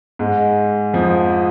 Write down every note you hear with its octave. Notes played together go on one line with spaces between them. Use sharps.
G#2 G#3
F2 F3